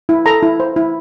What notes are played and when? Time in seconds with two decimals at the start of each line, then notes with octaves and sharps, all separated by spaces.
0.09 E4
0.26 A4 A#5
0.43 E4
0.60 C5
0.76 E4